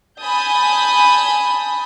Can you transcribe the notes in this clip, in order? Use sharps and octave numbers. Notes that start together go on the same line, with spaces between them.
G#5 A5 B5 D#6 G6